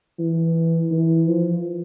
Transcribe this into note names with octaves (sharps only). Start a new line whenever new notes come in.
E3
E3
F3